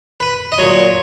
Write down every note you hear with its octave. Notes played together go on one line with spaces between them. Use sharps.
B4
D#5
A#2 F#3 C#5